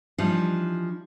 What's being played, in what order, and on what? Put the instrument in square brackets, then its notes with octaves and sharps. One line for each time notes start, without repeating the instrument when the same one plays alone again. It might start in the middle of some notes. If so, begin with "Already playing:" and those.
[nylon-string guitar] E3 F3 G3 D4 D#4